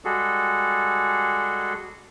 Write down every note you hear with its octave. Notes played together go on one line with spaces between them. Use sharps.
G3 G#3 F#4 G#4 A4